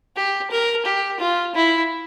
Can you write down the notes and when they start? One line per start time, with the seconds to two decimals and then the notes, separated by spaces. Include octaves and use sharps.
0.16 G4
0.51 A#4
0.86 G4
1.20 F4
1.55 E4